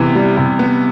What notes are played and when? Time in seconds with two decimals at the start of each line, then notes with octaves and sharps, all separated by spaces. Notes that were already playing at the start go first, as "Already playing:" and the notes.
Already playing: C3 E3 B3
0.15 G3
0.37 C3
0.59 B3